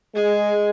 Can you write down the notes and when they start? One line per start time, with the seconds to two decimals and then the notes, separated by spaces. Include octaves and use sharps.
0.15 G#3 G#4